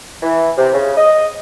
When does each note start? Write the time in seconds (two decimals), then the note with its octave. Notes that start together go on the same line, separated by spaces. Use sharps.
0.22 E3
0.57 C3
0.74 C#3
0.97 D#5